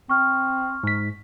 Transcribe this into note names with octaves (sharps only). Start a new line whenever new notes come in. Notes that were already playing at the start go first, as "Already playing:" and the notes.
C4 C#6 F6
G#2 B6